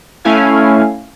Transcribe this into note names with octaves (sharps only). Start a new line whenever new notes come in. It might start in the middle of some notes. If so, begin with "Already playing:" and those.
A3 C#4 E4 F5 G#5